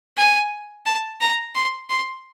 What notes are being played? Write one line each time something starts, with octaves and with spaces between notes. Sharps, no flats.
G#5
A5
A#5
C6
C6